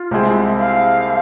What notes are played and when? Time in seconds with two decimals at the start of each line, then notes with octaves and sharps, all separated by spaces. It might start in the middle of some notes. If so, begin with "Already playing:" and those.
Already playing: F4
0.11 C2 C3 G#3 C4 G#4
0.59 F5